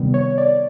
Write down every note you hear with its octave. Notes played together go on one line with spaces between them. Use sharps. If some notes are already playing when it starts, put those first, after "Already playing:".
Already playing: C3 D#3 G3 B3
C#5
D5